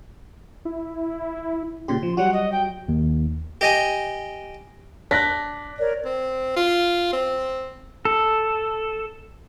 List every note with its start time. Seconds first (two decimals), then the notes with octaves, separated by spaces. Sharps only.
0.65 E4
1.88 A#2 C#3 G4 C6
2.03 F3
2.17 F#3 G3 F#4 F#5
2.33 D#5
2.52 G5
2.89 D#2
3.61 G4 D#5 G#5
5.11 D4 F#6 A#6 B6
5.79 A#4 C#5 D5
6.05 C4
6.56 F4
7.13 C4
8.05 A4